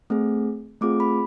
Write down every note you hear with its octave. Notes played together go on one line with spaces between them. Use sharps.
A3 C4 G#4
A3 C4 F4 G#4 D6
B5